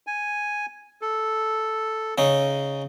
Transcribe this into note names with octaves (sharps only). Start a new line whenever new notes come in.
G#5
A4
C#3 D#4